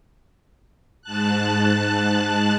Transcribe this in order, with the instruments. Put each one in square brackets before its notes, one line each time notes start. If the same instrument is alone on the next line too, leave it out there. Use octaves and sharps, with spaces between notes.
[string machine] G#2 A5 F#6